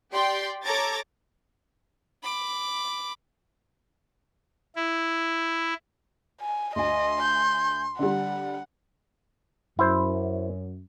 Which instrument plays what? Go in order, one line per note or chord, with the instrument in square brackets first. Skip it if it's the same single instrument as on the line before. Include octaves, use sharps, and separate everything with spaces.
[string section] G4 D5 G5 C6
A4 C#5 A#5 D6 G#6 A6
[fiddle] B5 D6
[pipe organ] E4
[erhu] G#5
[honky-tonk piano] D2 G#5 [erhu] D#5 [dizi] C6
[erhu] G6
[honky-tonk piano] D3 G3 [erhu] F#5
[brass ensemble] F#2 [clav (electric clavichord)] E4 C5